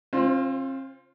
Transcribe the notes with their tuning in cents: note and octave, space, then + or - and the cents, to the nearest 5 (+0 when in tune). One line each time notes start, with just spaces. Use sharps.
C4 +40 F4 +0 C5 +0